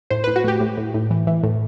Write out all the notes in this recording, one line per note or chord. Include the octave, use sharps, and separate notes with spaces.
A2 C5
A2 B4
F#4
A2 G4
A2
A2
A2
E3
E3
A2